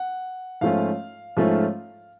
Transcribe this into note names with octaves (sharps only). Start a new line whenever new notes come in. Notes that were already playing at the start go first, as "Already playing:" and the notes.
Already playing: F#5
G#2 F3 A3 C#4 F4 F5
G#2 F3 A3 C#4 F4